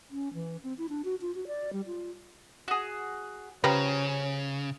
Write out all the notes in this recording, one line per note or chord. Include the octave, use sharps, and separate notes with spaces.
C#4
E3
C4
E4
D4
F#4
F4
F#4
D5
G3
F4
F#4 G#4
C#3 F3 G3 C#4 B4 A#5